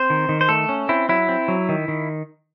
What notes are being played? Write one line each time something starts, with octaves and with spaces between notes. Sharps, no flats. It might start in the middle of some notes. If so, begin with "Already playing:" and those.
Already playing: C4 C5
D#3
D#3
C5
A3 A4
C#4
C4 E4
F#3 E4
C4
F#3
D#3
D#3